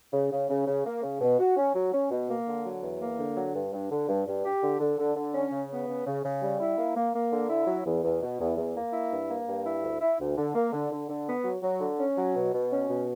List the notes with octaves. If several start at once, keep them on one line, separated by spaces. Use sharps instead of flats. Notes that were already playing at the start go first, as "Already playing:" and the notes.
C#3
C#3
C#3
C#3
A#3
C#3
B2
F#4
C#4
F#3
C#4
B2
A#3
D3
F#3
E2
A#3
D3
F#3
G2
G2
D3
G2
G2
G4
D3
D3
D3
D3
C#4
C#3
B3
C#3
C#3
C#3
G3
E4
A#3
A#3
A#3
D3
E4
F#3
E2
E2
B2
E2
E2
A#3
E4
G2
A#3
G2
E4
D2
E4
D2
D3
A#3
D3
D3
D3
B3
F#3
F#3
D3
C#4
F#3
B2
B2
C#4
B2